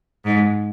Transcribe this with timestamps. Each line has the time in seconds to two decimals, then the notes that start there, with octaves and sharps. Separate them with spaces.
0.25 G#2